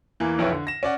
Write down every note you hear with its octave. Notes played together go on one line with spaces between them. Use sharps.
E2 E3 A#3
B1 F2 E4 B4 C#5
D3
A#6 E7
C#4 D5 F#5